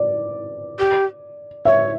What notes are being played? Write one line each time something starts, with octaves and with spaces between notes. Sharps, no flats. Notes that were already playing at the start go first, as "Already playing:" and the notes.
Already playing: D5
G4
C#5 E5